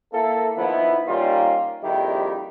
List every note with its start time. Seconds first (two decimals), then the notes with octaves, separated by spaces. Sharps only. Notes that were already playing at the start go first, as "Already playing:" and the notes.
0.13 A#3 E4 A4
0.56 D#3 F3 B3 E4
1.07 D#3 G3 A#3 C#4 D#4 F4
1.82 A#1 F2 D#3 G3 E4 G4